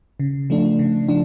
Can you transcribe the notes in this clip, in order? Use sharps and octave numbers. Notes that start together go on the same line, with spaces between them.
C#3
F3 A3 D4
C#3
F3 D4